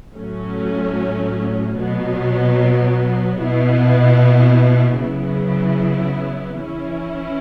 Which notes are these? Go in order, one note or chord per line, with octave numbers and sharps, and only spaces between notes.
A2 F#3 A3 C#4
B2 F#3 B3
B2 B3 E4
C#3 F#3 B3 E4
E3 C#4 E4